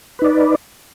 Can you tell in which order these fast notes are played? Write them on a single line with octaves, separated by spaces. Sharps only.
B4 D#4 D5